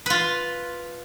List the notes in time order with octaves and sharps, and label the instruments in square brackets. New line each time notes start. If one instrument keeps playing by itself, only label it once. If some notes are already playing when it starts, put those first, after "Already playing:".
[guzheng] F4 B4